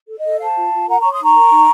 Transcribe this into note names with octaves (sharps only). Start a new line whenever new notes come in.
A4
D#5
A4
C5 F5 A5
F4
F4
A#4 F#5 A#5
C#5 A#5 C#6
C6 D#6
D#4 A#5 C#6
A#4
D#4